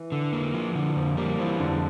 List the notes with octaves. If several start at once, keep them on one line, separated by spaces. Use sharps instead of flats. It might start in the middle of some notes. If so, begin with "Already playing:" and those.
Already playing: E3
D3
A#3
F3
D3
F2 F3
G3 A#3
E3 F3
F2 D3